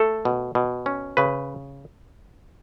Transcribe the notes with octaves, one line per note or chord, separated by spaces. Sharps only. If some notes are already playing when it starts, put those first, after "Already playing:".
Already playing: A3 A4
B2
B2
C#4
C#3 B4